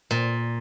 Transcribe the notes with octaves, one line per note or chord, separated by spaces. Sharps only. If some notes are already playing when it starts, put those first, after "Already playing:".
A#2